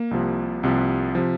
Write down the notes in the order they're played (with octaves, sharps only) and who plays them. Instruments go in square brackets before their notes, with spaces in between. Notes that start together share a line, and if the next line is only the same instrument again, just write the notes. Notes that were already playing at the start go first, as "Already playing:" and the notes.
Already playing: [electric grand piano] A#3
C2 C3 F3
C2 C3 F3
C3 F3